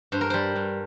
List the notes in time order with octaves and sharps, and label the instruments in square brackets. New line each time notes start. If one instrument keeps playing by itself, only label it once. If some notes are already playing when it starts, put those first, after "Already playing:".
[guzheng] G2 C5
A#4
G3 C5
G2